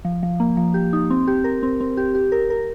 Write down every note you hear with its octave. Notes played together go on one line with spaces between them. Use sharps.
F3
F3
A#3
F3
G4
D#4
C4
G4
A#4
C4
C4
G4
G4
A#4
A#4